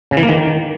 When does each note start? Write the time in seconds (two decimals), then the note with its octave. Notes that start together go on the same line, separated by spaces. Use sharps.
0.11 C#3
0.17 E3
0.23 A#3
0.29 D#3